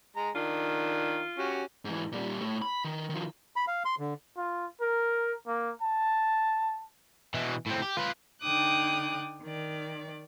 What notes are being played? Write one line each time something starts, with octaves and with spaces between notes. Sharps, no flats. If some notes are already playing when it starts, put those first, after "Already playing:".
G#3 A#5
D#3 D4 F4
C#4 F#4 G4
G#2 E3
A#2 G3
A2
B5
D#3
D#3 F3
B5
F5
C6
D3
F4
A#4
A#3
A5
B2 E3
A2 C4
G4
F4 B4
D3 D#4 G5 D6 D#6 F#6
D#3 D5